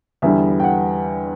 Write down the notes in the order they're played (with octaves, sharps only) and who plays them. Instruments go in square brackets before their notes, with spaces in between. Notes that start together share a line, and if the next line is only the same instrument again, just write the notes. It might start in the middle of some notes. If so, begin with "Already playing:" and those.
[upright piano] E2 D3 G3 E5
G5
F#5